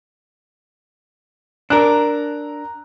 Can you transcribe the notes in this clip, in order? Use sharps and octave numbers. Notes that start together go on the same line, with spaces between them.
D4 A#4 A#5 F#6